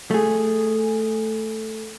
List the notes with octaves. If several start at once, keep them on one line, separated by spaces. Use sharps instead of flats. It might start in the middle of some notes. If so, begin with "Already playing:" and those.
A3 G#4